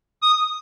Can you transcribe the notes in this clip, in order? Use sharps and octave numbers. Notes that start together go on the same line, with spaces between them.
D#6